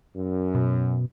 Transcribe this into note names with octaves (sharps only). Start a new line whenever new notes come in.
F#2
B2